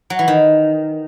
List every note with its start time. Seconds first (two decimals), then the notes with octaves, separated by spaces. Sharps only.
0.10 F#3
0.19 E3
0.28 D#3